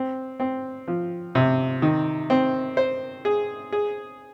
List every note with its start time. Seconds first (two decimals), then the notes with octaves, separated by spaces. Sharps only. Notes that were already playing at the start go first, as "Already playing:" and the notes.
Already playing: C4
0.40 C4
0.88 F3
1.35 C3
1.82 D#3
2.30 C4
2.77 C5
3.25 G#4
3.72 G#4